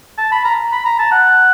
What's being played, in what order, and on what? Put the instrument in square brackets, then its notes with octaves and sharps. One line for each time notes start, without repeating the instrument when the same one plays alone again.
[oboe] A5
B5
A#5
B5
A#5
A5
F#5